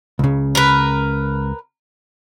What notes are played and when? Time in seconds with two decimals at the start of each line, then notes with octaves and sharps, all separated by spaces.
0.19 C#2 C#3
0.55 A#4 B4